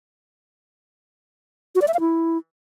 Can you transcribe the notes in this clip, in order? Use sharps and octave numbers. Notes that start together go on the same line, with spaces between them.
F#4
D5
E5
F5
E4